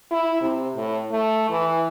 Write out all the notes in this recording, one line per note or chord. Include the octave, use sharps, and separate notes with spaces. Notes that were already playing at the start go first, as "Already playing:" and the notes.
E4
C3
A2
A3
E3